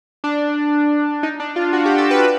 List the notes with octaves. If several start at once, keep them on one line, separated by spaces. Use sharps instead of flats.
D4
D#4
D4
F4
F#4
G4
A4
B4